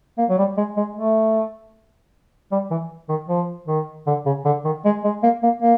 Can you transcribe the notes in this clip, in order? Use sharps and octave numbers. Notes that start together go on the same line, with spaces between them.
A#3
F#3
G3
G#3
G#3
A3
G3
E3
D#3
F3
D#3
D3
C#3
D3
D#3
G#3
G#3
A#3
A#3
A#3